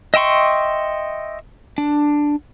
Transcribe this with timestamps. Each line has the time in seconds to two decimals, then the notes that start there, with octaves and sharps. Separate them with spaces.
0.14 D#5 E5 G5 C6 C#6
1.78 D4